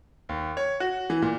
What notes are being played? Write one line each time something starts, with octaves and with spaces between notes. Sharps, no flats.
D#2
C#5
F#4
E3
A#2